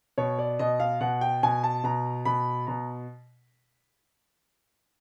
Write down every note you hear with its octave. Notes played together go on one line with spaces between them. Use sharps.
B2 C#5
D5
B2 D#5
F5
B2 F#5
G5
B2 G#5
A5
B2 A#5
B2 B5
B2 A#5